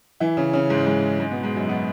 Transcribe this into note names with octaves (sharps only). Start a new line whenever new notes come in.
E3 E4
C#3 C#4
C#3 C#4
G#2 G#3
G#2 G#3
G#2 G#3
B2 B3
G#2 G#3
F#2 F#3
B2 B3